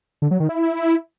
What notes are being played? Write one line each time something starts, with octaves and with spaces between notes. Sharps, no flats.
D3
F#3
D#3
E4